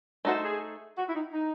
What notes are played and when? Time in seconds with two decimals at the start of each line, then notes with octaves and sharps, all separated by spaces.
0.25 A3 D#4 F#4 A4 C5
0.43 G#4
0.97 F#4
1.08 E4
1.14 D#4
1.33 D#4